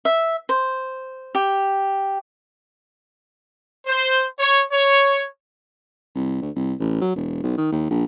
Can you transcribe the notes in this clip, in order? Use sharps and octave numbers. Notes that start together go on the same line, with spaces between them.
E5
C5
G4
C5
C#5
C#5
C2
D2
C2
A1
F#3
E1
B1
D#3
D#2
A#1